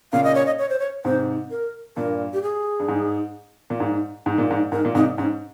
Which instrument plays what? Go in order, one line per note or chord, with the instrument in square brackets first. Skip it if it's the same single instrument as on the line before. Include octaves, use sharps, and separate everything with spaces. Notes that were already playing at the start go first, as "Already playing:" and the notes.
[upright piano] A#2 C#3 [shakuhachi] F5
[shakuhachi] D#5
C#5
D#5
C#5
C5
C#5
[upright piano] G#2 C3 [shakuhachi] C5
[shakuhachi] A#4
[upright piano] G2 A#2 [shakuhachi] A#4
[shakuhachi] G4
G#4
[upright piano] G2
G#2
A#2
G#2
G#2
A#2
G#2
[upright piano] G#2 [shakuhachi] A#4
[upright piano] A#2
[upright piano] G#2 C3 [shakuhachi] D#4
[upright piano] G#2 [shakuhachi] C#4